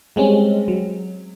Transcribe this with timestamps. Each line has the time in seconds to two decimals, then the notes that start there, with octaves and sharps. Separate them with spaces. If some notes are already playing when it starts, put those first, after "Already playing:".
0.16 G3 G#3 C4 C#4
0.68 F#3